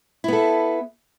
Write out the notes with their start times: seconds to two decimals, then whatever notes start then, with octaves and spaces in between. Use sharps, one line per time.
0.24 E4
0.28 B3
0.33 A4